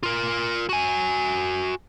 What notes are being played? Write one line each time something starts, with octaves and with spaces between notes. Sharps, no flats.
F4 A#4
F#4 G#5